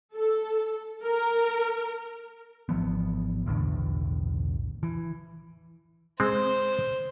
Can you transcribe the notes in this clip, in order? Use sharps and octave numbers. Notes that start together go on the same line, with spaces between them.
A4
A#4
G#1 E3 F3 B3
B1 E2 A2 D3
E3
G#3 C4 C5